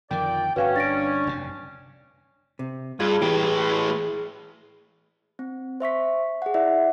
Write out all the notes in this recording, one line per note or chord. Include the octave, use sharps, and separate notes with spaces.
F2 A#2 D3 D#3 D5 G5
G1 G2 C#4 F#4 B4 F5 G5
D4 A6 A#6 D7
F1 C3
C3
G2 F4 G#4
A2 E3 G4 B4
C4
C5 E5 C#6 B6
G#4 F#5
E4 D5 E5 F#5